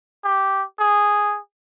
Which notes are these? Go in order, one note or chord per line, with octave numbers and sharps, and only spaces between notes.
G4
G#4